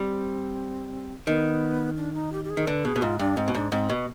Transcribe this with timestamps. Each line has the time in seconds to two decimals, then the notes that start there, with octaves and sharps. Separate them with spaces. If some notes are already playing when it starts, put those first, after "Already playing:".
Already playing: G3 C4
1.27 D#3 B3
1.97 D4
2.14 D#4
2.32 G4
2.44 G4
2.50 G#4
2.57 D#3
2.67 D3 B4
2.85 B2 G#4
2.96 B2
3.02 G#2 F4
3.19 G2 D4
3.37 G#2 C4
3.48 B2
3.55 G#2 D4
3.71 G#2 C4
3.89 B2 B3